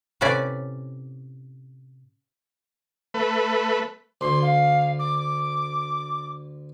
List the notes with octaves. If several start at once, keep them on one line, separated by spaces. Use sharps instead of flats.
A2 C3 C#4 B4 D5
A3 B4
D2 C6
F5
D6